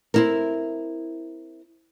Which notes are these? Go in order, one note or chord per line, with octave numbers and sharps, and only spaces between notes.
C4 E4 A#4